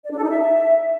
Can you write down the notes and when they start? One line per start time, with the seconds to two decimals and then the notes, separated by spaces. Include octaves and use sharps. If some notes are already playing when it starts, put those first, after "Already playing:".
0.05 D5
0.11 D4
0.17 A4
0.23 D#4
0.29 E5